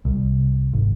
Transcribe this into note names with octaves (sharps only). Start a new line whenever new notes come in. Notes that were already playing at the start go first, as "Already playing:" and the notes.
C2
G#1